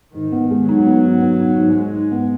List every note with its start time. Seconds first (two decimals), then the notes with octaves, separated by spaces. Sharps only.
0.14 G#2 D#3
0.32 B3
0.51 G#3
0.68 F#3 D#4
0.86 B3
1.04 G#2
1.21 B3
1.40 D#4
1.58 G#2
1.75 G#2 G#3
1.93 G#2
2.12 B3